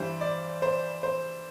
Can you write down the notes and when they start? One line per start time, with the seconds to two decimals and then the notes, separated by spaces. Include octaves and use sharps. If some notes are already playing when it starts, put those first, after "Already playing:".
Already playing: G2 E3 G3 C5
0.21 D5
0.62 C5
1.03 C5